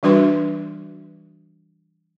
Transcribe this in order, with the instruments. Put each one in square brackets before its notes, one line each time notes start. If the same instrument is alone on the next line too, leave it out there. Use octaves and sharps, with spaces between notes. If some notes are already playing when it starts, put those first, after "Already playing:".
[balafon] E3 G3 D4 F#4 B4 C6